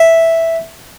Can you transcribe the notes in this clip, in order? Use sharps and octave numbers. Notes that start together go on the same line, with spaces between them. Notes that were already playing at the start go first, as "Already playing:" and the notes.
Already playing: E5